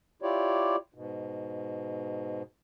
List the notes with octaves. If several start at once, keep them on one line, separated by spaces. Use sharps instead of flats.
E4 F4 G4 C#5 D5
G#2 B2